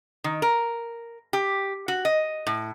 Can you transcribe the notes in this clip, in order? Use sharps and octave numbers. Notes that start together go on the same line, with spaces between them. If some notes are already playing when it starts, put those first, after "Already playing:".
D#3
A#4
G4
F#4
D#5
A2